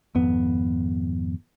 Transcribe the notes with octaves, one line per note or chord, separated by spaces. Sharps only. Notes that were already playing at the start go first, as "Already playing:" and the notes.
G#1 F2 B3